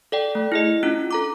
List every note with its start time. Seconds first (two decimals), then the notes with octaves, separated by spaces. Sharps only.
0.12 A4 D5 G5
0.35 A3
0.52 E4 G#4 D#5
0.83 C#4 D4 F4 F#6
1.11 A4 A#5 D6